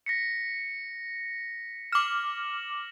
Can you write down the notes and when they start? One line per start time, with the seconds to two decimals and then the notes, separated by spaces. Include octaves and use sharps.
0.06 A#6 B6 C#7
1.92 D6 F6 E7 F#7